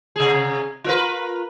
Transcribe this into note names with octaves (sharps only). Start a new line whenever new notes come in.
C3 G#4
F4 A#4 B4